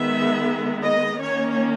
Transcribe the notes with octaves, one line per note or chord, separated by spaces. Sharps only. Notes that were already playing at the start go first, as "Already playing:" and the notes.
Already playing: D#3 G#3 B3 E5
D#5
D#3 A#3 C#4 C#5